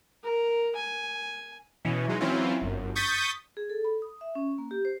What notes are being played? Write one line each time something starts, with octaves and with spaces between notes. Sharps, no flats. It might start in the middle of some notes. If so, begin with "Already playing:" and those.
A#4
G#5
B2 E3 C#4
F#3 G#3 D#4
E3 F#3 C4 C#4 E4 F4
G1 F#2
C#6 D#6 G6 A6 B6
G#4
A4
B5
D#6
E5
C#4
A#3
G4
C5